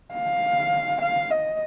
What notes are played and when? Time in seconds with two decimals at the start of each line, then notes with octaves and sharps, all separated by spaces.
0.15 F5
1.01 F5
1.30 D#5